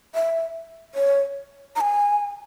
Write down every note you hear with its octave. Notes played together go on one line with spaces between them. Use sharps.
E5
C#5
A#5
G#5